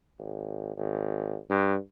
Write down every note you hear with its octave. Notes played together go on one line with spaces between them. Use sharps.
G#1
G#1
G2